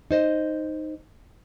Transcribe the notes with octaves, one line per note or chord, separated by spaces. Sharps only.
D#4 C5 D#5